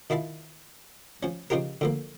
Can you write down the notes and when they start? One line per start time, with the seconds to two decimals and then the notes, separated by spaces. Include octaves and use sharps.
0.10 D#3 E4 F4 E5 A5
1.23 F3 C#4
1.50 C#3 F3 D#4 F4 G4 A#4
1.81 D3 F3 A#3